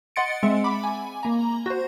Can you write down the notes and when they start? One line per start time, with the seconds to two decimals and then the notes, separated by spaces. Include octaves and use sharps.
0.16 D#5 F#5 C6 A6 C#7 D7
0.43 G#3 C4 E5
0.64 B5 D6
0.83 G#5
1.23 A#3 A#5
1.66 F#4 C5